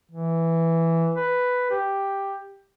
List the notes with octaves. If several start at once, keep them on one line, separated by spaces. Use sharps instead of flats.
E3
B4
G4